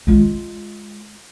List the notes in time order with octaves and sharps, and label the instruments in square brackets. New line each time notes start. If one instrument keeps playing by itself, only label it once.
[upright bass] G#3 F4